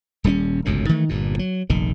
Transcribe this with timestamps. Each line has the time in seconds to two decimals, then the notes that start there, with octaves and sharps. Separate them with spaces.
0.24 D#1 G3 C4 C#4
0.65 G1 C#2 F#2 A2
0.89 D#3 E3 A3
1.09 G1 G2 A#2
1.39 F#3
1.70 F1 A#1 D#3